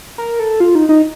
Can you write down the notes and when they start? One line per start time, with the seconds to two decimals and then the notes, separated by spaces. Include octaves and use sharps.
0.18 A#4
0.40 A4
0.60 F4
0.75 D#4
0.89 D#4